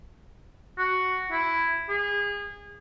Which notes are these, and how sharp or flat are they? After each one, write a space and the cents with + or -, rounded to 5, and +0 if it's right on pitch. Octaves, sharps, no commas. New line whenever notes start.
F#4 +5
E4 +5
G#4 -30